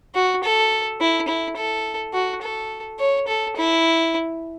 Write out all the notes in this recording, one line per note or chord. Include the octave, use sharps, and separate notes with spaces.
F#4
A4
E4
E4
A4
F#4
A4
C#5
A4
E4